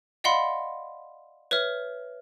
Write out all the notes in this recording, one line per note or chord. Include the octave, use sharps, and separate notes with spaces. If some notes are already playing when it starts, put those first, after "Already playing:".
D5 D#5 F5 F#5 B5 C6
B4 C#5 E5 F6